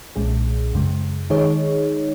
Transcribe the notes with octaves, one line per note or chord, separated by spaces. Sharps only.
B1 A#2 G#3 C#4 G#4
F#2 C#3 G#3
D#3 G#3 D#4 G#4 C#5